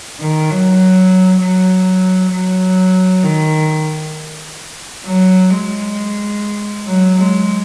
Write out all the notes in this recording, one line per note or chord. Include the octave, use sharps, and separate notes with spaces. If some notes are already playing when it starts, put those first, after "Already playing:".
D#3
F#3
F#3
F#3
D#3
F#3
G#3
F#3
G#3